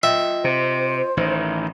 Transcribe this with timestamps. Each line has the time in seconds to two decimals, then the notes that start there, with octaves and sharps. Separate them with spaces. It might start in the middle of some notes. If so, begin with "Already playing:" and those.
0.03 F4 D#5 E5 G5
0.44 C3 C5
1.17 A1 D#3